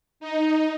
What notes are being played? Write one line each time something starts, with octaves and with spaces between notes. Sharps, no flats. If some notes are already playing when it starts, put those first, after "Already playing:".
D#4